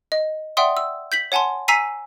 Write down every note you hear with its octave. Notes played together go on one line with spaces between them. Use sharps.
D#5
D5 E5 F#5 G5 C6 D#6
E6
G6 B6 F#7
C#5 F#5 G#5 A5 C6
G#5 A#5 E6 B6 C7 D#7